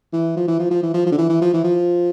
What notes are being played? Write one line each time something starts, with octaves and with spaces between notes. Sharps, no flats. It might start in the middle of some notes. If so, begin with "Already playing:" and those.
E3
F3
E3
F3
F3
E3
F3
F3
D3
E3
E3
F3
E3
F3